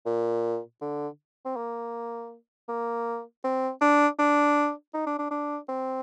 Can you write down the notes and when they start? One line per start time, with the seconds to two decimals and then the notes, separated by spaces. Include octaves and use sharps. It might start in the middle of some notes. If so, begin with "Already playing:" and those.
0.06 A#2
0.81 D3
1.45 C4
1.57 A#3
2.69 A#3
3.44 C4
3.81 D4
4.19 D4
4.94 D#4
5.07 D4
5.19 D4
5.31 D4
5.69 C4